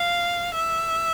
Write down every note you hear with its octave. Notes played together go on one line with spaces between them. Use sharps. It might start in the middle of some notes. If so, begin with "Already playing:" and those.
Already playing: F5
E5